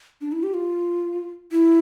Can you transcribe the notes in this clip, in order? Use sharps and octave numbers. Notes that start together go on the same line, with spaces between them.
D4
E4
G4
F4
E4